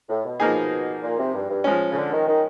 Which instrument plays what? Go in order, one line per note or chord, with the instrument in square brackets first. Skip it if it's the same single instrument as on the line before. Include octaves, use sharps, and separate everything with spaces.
[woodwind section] A2
B2
[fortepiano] F3 A#3 D#4 G#4
[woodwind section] A#2
C3
G2
G2
[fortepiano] F3 G#3 C#4
[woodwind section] C#3
D3
D#3
D#3